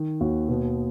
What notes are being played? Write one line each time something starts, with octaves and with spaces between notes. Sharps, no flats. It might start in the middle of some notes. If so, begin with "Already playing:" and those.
Already playing: D#3
D#2 F#4
B2